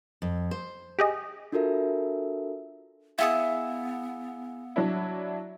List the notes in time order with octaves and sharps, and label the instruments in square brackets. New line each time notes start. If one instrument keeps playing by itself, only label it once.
[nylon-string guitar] F2
C5
[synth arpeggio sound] G4 G#4 D#5
[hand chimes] D4 F4 F#4 A4 A#4 E5
[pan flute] B3 [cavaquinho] E4 G#4 D#6 [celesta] F5 F#5 E6
[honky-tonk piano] F#3 D4 E4